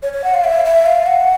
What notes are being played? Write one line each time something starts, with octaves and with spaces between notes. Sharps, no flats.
C#5
C#5
F#5
F5
E5
E5
F5
F#5